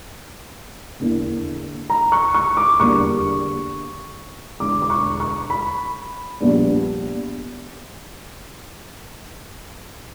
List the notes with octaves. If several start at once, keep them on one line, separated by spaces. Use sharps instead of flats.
E2 D3 A#3 E4
A#5
C#6
C#6
D6
E2 D3 G3 A#3 C#6
E1 E2 D3 D6
D6
C#6
C#6
B5
A#1 A#2 G3 B3 D4